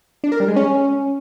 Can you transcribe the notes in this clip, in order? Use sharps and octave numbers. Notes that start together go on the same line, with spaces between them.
D4
A#4
G3
G#3
C#4